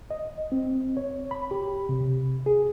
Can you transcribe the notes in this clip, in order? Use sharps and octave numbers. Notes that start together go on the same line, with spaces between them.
D#5
C4
C#5
B5
G4
C3
G#4